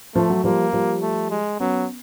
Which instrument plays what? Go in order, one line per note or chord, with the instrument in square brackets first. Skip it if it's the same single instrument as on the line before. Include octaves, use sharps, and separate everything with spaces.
[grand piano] F3 [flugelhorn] A3
[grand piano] F#3
[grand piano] F3 G3 [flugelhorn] A#3
[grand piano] F3 G3
[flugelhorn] A3
G#3
[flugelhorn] F#3 [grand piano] B3 C#4